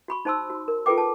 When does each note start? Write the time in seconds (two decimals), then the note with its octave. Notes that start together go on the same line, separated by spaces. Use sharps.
0.08 F#4 B5 C#6
0.25 D#4 C5 A5 C6 E6
0.50 F#4
0.68 A#4
0.86 F4 G#4 A4 B4 G5 D6
0.98 A5